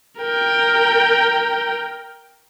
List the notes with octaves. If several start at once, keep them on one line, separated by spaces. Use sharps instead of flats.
A#4 G5